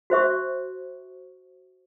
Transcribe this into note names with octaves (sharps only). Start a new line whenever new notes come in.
F#4 C5 E5 C#6